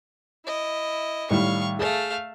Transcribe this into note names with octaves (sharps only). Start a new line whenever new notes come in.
E4 D#5
A2 D#3 G3 F5 C#6
A3 G#4 F5